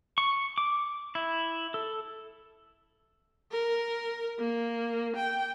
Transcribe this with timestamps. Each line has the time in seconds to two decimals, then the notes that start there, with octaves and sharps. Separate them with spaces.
0.18 C#6
0.58 D6
1.15 E4
1.74 A4
3.52 A#4
4.39 A#3
5.16 G5